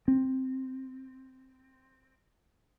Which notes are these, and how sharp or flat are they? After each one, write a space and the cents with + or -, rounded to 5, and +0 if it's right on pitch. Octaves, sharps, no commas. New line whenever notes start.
C4 +0